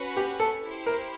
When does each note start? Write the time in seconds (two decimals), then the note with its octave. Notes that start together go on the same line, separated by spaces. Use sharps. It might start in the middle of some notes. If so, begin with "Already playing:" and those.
Already playing: C#4 F#4 B4
0.17 G4
0.40 A4
0.63 E4 G4 C5
0.86 A#4